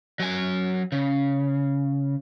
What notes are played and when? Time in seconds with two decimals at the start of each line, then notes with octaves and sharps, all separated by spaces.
0.20 F#3 G#5
0.92 C#3